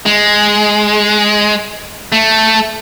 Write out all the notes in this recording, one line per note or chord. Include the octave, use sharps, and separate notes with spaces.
G#3
A3